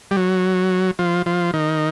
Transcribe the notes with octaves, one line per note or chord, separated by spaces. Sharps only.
G3
F#3
F3
F3
D#3